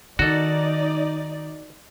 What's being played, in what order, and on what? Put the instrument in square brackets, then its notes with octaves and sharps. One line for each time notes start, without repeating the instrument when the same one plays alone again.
[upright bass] D#3 [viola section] D#4 D5 [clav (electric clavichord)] F#4 A4